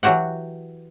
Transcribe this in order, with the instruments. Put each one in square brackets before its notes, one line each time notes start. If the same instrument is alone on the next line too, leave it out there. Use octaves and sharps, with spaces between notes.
[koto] E3 F#3 F#4 G4 F#5